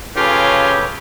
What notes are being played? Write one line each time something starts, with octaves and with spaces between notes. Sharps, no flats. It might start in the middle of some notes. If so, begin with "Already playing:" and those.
C#3 F4 G4 A4 B4 C#5